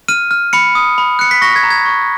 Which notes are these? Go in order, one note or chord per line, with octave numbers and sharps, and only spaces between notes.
F6 D#7
F6
B5 C#7
D#6
B5
F#6 C#7
B6
C#6 A#6
G#6
A#5
G#6
C#6